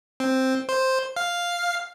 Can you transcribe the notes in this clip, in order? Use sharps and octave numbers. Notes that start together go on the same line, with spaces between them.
C4
C5
F5